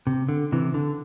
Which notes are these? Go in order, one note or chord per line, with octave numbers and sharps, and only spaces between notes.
C3
D3
C3 E3
D3